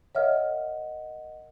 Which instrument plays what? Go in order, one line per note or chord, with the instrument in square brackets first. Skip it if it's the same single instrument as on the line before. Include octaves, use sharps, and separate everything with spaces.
[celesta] A#4 D#5 F#5 [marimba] C#5 E5 F6